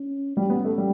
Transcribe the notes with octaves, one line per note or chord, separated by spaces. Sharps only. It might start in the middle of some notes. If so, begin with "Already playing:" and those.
Already playing: C#4
G3 C#4
B3
A3
G3